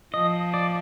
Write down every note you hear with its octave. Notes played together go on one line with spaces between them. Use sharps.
F3 D#5
D5